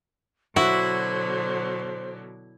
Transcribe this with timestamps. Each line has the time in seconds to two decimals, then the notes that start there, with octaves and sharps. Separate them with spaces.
0.56 B2 D3 F#3 E4 F#4 C5